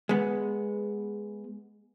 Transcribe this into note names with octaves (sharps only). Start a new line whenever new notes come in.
G#3 B3